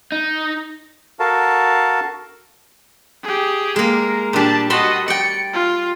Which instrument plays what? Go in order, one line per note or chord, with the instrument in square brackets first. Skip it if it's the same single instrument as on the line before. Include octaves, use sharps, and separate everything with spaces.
[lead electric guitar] D#4
[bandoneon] F#4 A4 A#4 F5 A5
[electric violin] G4 G#4
[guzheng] G#3 A#3 [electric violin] A#4
[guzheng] A#2 G3 [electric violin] D4 A5
[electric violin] F#4 D#5 [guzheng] A5 B5 C6
[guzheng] D5 G5 [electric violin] C#7
[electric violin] F4